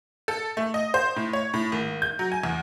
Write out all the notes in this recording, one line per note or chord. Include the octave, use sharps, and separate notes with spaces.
A4
A3
D#5
C5
A2
C#5
A2
G#1
G6
F#3
G#5
E2